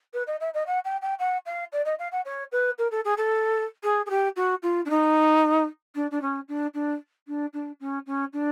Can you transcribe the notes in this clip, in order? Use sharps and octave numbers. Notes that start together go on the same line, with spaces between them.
B4
D#5
E5
D#5
F#5
G5
G5
F#5
F5
D5
D#5
F5
F#5
C#5
B4
A#4
A4
G#4
A4
G#4
G#4
G4
F#4
F4
D4
D#4
D4
D4
C#4
D4
D4
D4
D4
C#4
C#4
D4